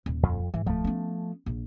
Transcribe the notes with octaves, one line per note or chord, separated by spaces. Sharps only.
D#1
F2
G#2 E3
D1 D#2 F3 A3
B3 C#4
A#1